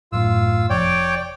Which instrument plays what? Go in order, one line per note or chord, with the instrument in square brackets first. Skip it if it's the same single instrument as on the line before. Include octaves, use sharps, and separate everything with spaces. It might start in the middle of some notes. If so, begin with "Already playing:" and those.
[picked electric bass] A1 F#2 A2 [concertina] F4 E6
[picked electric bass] F1 F2 [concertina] C#5 D5 G5